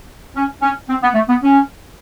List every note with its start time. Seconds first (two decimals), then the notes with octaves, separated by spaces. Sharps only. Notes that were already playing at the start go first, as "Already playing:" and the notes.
0.36 C#4
0.62 C#4
0.89 C4
1.03 B3
1.15 A3
1.29 B3
1.42 C#4